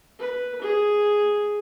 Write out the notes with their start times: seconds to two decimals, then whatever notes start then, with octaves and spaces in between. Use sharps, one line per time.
0.19 B4
0.62 G#4